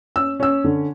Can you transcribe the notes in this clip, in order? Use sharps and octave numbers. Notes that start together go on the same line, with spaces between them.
C#4 E6
C#4 E6
D3